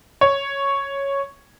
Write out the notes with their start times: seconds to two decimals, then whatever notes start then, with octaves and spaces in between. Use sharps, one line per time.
0.21 C#5